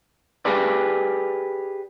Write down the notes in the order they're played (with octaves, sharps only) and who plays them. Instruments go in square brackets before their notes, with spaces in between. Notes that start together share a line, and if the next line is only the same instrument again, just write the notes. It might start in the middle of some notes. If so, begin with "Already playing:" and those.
[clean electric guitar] G4 G#4 B4 D5